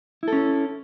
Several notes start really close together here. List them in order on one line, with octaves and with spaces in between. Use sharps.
E4 A4 C#4